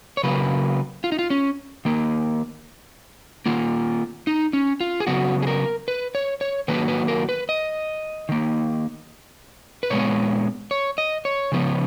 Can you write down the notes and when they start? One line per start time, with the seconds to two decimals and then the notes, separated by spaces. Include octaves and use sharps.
0.17 C#5
0.23 C#3 F#3 A#3 B4
1.04 F4
1.12 D#4
1.19 F4
1.30 C#4
1.85 D#3 A#3
3.46 D#3 A#3 F4
4.27 D#4
4.53 C#4
4.81 F4
5.00 G#4
5.07 C#3 F#3 B3 F#4
5.42 G#4
5.47 A#4
5.88 B4
6.15 C#5
6.41 C#5
6.68 D#3 F#3 A#3 B4
6.88 B4
7.08 A#4
7.29 B4
7.49 D#5
8.29 D#3 A#3
9.83 B4
9.90 A#2 G#3 B3 C#5
10.71 C#5
10.98 D#5
11.25 C#5
11.52 C#3 F3 B3